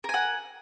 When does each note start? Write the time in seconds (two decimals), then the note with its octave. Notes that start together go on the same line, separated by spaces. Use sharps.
0.04 A#4
0.09 G#5
0.14 F#5